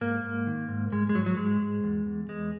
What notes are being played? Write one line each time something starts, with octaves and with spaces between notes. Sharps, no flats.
G#2 A#3
G#2
D#3
G#2
G#2 G#3
G#3
G#2 F#3
F#3
G#2 G#3
G#2
E2
E2
E2 G#3